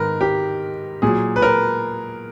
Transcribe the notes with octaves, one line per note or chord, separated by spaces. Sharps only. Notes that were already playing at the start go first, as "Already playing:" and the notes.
Already playing: G#2 D#3 A#4 B4
G4
A#2 F#3 G#4
B4
A#4